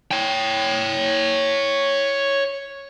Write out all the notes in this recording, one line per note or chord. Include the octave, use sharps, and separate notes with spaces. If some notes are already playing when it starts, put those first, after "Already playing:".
C#5 G5